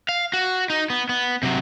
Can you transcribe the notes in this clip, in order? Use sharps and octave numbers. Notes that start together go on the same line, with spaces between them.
F5
F#4
D#4
B3
B3
C3 F#3